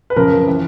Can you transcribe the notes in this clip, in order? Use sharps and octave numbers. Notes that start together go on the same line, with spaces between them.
B4
F#2 C#3 F3 A#4
E3